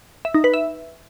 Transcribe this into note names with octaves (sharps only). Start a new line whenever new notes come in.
E5
D#4
B4
E5